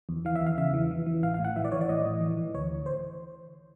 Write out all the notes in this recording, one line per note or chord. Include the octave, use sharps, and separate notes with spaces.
E2
E3 F5
E5
E2
F5
C#3 E5
E3
E3
E3
A1 F5
F5
A2
F#5
E3 E5
D5
E3 C#5
D5
A2 D#5
A2
E3
E3
D2 C#5
D2
C5